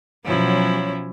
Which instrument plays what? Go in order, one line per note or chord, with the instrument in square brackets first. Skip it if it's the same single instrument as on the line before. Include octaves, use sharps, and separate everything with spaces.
[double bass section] B2 F#3 C#4 [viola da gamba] F3 E4